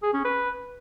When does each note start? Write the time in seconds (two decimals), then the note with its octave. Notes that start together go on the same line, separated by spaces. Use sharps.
0.03 G#4
0.14 C#4
0.25 B4